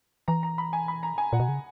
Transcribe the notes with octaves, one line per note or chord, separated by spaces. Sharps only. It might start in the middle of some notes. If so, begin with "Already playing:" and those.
E3 A#5
A#5
B5
G#5
B5
A#5
G#5
A#2 F#5
B2
C#3